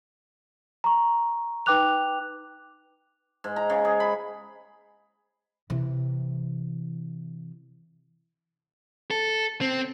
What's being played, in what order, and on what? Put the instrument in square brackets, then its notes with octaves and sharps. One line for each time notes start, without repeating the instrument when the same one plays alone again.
[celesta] A#5 C#6
D#4 B4 G5 D6 F#6 F7
[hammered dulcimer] G#2
A#5
C#3
G#4
B5
[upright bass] C3 E3
[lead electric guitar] A4
C4